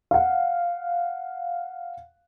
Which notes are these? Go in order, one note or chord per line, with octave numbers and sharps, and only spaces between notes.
F5 F#5